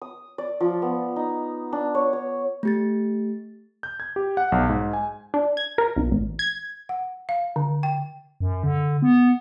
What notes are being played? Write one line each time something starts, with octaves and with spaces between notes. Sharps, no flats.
D#6
D5
F3
B3
D#4
D4
C#5
C#5
A3 G4 A6
G6
G#6
G4
F#5
B1
G#2
G#5
D4
G#6
A#4
B1
A1
G#6
F#5
F5
D3
G5
F#2
D3
B3